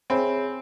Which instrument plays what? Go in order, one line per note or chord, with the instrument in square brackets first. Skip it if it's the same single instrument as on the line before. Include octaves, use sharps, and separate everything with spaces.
[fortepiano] C4 [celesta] G#4 C#5 E5 G#5 B5